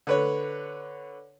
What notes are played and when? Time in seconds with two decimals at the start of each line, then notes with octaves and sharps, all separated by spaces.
0.07 D3 B4 C#5